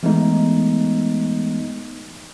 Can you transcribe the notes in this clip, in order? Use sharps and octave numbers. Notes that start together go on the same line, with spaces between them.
E3 G#3 A3 B3 D#4